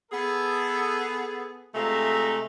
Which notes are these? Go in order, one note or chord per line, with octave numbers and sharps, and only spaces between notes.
B3 G#4 A4
C3 G#3 A3 F4 E5 A#5